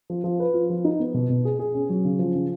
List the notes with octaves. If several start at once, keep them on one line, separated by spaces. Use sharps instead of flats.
F3
F3
B4
F4
F3
D#4
B3
B2
B2
G#4
G#4
C#4
F#3
C#3
F3
C#3